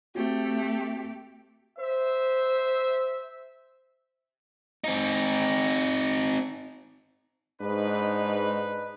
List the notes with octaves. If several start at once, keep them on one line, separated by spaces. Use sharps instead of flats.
A3 C4 F#4 G4
C5 E5
C4 D#4
G#2 D4 D#4 B4